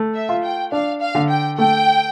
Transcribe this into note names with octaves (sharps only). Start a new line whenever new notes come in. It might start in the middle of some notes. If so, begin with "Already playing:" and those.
Already playing: A3
E5
F4
G5
D4 F5
F5
D3
G5
A3 G5